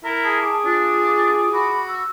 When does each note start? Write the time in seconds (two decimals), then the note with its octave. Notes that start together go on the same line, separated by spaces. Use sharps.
0.04 E4 A#4
0.24 G#4 A5
0.42 G#4 D6
0.65 D4 F4
1.53 F#4 B5
1.88 E6